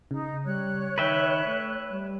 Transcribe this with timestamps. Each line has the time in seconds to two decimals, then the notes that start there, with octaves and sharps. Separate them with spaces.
0.11 C#3 D#4
0.45 G3 C#5 F#6
0.98 D#3 B4 E5 G5
1.46 A3
1.90 G3